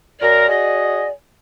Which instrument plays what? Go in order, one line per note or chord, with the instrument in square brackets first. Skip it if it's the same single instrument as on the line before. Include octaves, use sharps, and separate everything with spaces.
[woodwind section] F#2 A#4 [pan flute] D5
[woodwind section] F#4 G#4 D#5